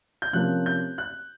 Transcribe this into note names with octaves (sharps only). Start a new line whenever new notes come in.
G6
C3 F3 A#3 C#4 F#6
G6
F#6